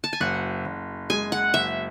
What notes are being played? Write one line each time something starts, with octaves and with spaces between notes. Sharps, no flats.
A5
G#5
F#1 F#5
F#1
G#3 G#5
F#5
F#1 E5